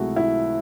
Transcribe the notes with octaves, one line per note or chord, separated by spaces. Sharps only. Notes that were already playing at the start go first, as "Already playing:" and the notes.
Already playing: C#2 C3 F#3 A3 E4 F#4 G#4
E4